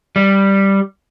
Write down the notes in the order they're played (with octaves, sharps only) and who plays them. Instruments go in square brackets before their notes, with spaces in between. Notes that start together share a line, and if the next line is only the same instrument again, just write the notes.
[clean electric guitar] G3